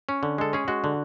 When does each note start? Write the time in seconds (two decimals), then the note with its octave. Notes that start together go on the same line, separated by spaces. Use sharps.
0.09 C#4
0.23 D3
0.38 G#3 A4
0.53 C#4 G#4
0.68 G#3 F#4
0.84 D3